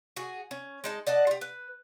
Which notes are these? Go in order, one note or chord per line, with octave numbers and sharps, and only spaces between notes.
F#4 G#4
C#4
G#3 D#4 A5
D5 D#5 F#5 A5
F4 G4
B4